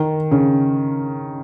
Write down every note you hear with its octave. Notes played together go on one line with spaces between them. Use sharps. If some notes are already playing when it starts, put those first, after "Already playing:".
Already playing: D#3
C#3